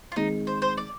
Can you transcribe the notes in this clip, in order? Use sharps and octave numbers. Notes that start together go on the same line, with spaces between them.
F4
D#3 G#3 C4 D#4
C5
C5
D5